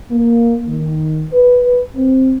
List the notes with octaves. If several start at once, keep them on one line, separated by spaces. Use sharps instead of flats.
A#3
D#3
B4
C4